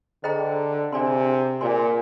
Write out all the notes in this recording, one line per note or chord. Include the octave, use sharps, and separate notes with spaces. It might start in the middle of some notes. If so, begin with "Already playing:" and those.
D3 G#4 C5 D#5 G5 A#5
C3 D4 G#4 D5 G#5 C6
A#2 G#4 D5 G#5 C6